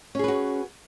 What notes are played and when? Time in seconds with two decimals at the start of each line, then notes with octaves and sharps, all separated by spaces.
0.15 C#4
0.19 G#4
0.24 B4
0.28 F#4